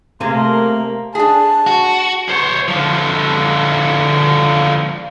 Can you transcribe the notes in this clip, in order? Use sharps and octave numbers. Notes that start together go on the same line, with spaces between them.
C3 A3 A#3 G#4 A#4 G#5 C6
D4 G#4 A5
F#4
C5 C#5
D3 F3